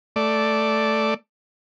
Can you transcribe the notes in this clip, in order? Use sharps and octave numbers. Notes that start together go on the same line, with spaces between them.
A3 D5